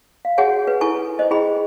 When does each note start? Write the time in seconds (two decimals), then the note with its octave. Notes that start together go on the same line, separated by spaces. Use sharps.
0.25 F5
0.38 F#4 G#4 C#5 F#5 G#5
0.67 B4
0.81 E4 A4 G#5 C#6
1.19 C5 D#5
1.31 E4 G#4 G5 B5